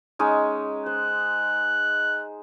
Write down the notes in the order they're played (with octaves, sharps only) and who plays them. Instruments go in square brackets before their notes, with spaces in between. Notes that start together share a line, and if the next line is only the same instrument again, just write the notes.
[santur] G#3 C#4 D#4
[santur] C5 [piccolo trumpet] F#6